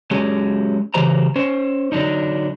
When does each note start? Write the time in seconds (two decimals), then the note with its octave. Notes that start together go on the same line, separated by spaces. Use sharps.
0.11 F#3 G#3 C#4 G4 G#4
0.94 C#3 E3 F#3 G4 C5 A#5
1.36 C#4 C5
1.92 D3 F#3 D4 D#4